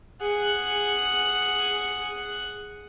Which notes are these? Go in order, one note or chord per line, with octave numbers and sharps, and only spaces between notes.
G#4 F#5